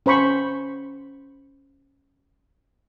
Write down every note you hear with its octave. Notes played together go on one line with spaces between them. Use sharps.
C#4 C5 B5 C#6